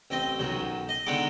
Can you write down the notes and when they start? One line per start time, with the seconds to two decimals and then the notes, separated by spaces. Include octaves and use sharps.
0.10 A1 C4 D#5
0.39 B1 F#2 D#3
0.89 D#5
1.06 D3 D#3 G#3 B3 A#5 D6